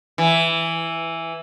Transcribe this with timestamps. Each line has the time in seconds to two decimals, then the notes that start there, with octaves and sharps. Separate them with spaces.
0.18 E3